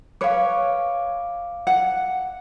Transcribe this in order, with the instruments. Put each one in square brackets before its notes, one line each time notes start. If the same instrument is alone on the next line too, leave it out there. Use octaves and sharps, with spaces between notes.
[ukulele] B4 C#5 [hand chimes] F5 D6
[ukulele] F#5